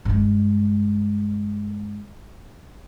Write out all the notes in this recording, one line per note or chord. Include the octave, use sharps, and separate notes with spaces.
G2 G#3